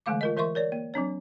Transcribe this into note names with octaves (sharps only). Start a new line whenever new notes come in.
D3 E3 G#3 A3 F5 D6
F4 A#4 D#5
E3 A#4 E5 C6 C#6
A#4 C#5 D5
A#3
F#3 C4 D4 C#5